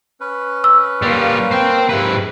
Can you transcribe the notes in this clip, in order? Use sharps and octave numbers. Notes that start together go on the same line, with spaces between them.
C#4 B4
E6
G3 A#3 F4
C5 G5
G#2 C3 E4 B4